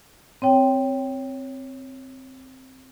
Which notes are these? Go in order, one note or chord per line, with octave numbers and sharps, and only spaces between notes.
C4 C#5 G5